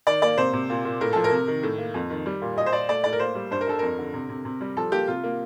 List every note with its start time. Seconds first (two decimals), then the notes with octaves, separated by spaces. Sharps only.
0.07 D#3 D5
0.22 A#3 D5
0.37 C3 C5
0.53 C3
0.70 A#2
0.85 A#2
1.01 A2 A#4
1.13 F3 A4
1.24 A#4
1.32 C3
1.48 D#3
1.63 A2
1.78 A#3
1.94 F2
2.10 D#3
2.26 G3
2.42 A#2
2.57 A#2 D#5
2.66 C5
2.73 A#2 D5
2.89 A3 D5
3.04 A2 D5
3.13 A#4
3.19 A#3 C5
3.35 G3
3.51 G2 C5
3.61 A#4
3.67 G2 A4
3.79 F2 A#4
3.99 D3
4.14 C3
4.29 C3
4.45 C3
4.61 G3
4.77 F3 A4
4.92 A#3 G4
5.07 C3 F4
5.24 A#3